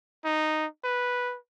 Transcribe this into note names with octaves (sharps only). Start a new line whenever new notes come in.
D#4
B4